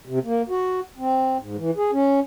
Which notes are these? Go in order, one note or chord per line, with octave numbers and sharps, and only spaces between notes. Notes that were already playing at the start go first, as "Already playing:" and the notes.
C3
A#3
F#4
C4
G#2
E3
G#4
C#4